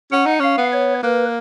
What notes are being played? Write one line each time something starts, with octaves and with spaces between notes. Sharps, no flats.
C#4 F#5
D#4
C#4 F5
B3
C#5
A#3 B4